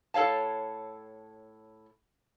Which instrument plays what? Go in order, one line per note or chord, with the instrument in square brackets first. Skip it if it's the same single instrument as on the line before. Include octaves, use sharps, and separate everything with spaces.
[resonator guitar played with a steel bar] A2 A4 C#5 F5 A5